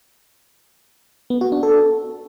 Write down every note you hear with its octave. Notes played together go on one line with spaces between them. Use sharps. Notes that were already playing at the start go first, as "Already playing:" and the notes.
B3
F#4
D4
A4